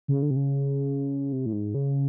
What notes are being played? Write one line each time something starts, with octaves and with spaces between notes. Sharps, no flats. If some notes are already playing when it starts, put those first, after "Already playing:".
C#3
D3
C3
C#3
C3
A2
G#2
C#3